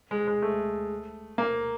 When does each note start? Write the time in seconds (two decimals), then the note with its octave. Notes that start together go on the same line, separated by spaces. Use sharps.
0.11 G#3
0.27 G#3
0.42 A3
1.38 A#3